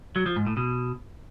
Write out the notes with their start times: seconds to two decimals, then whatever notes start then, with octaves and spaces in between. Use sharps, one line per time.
0.16 F#3
0.26 F3
0.36 G#2
0.47 A2
0.57 B2